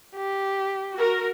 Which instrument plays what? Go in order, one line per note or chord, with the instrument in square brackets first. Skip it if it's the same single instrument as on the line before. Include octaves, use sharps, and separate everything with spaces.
[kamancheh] G4
[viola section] F#4 A#4